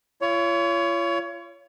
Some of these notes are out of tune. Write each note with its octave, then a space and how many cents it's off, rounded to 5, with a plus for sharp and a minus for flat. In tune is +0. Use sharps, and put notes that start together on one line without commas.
F4 -40 C#5 +25